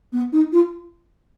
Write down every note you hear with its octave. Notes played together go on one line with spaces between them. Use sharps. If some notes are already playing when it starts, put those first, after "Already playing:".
B3
D#4
F4